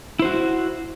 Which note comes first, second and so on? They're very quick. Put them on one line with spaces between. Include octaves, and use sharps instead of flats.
E4 C5 F#4